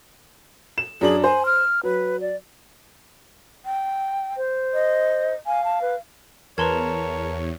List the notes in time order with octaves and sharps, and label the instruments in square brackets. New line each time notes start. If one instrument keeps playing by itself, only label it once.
[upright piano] E7
[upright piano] F#2 D4 F#7 [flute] G#4
[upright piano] C5 [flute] G#5
[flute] F6
[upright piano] F#3 [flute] B4
[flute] D5
[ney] G5
[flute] C5
[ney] D#5
[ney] F5 [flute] G#5
[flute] A5
B4
[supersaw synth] E2 [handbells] A#4 A5 A#5 [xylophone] B4 C6 G#6 [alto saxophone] C#5